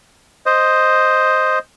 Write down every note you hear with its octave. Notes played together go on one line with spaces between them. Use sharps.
C5 D#5